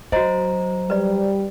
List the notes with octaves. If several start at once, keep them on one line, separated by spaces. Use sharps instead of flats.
F#3 F#4 C5 C#5 D#5 A#5
G3 B4 D5